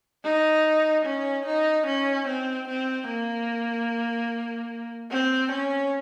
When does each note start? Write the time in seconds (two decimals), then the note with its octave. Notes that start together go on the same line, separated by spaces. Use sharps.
0.24 D#4
1.06 C#4
1.46 D#4
1.86 C#4
2.27 C4
2.68 C4
3.09 A#3
5.11 C4
5.52 C#4